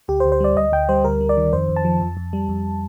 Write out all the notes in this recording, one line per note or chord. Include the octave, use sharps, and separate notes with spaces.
D2 G4
C5
D2
C5
G3 D5
D2 D#5
D2 G5
G3 C5
D2 A#4
G3
D5
D#3
F2 C5
F2
A5
F3
F2
F2
G3
F2